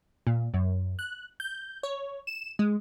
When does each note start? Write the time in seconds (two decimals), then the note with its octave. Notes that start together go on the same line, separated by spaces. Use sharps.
0.27 A#2
0.54 F#2
0.99 F#6
1.40 G6
1.83 C#5
2.27 E7
2.59 G#3